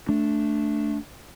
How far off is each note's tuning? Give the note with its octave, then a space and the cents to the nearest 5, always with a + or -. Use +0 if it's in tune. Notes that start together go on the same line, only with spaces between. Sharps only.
A3 +0 D4 -5